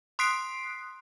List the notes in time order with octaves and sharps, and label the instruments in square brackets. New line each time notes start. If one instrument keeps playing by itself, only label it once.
[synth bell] C6 D#6 F#6 B6 C7 D7